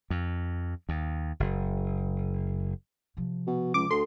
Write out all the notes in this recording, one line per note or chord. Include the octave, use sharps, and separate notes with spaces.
F2
D#2
F#1
C3 F3
B2
C#2 D6
D2 A4 C6